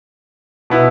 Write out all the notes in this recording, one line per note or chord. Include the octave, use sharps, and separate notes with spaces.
B2 B3 E4